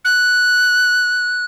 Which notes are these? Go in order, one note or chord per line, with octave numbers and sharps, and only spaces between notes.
F#6